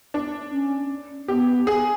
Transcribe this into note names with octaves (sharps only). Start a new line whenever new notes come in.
D4
C#4
B3 G4
G#4